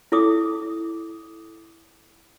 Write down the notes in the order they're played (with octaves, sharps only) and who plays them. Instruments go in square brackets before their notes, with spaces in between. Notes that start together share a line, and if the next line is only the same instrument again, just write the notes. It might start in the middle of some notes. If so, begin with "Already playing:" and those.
[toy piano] E4 A4 D6 D#6